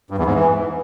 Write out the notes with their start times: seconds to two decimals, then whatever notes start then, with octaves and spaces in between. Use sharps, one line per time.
0.10 G2
0.18 E2
0.26 G#2
0.34 E3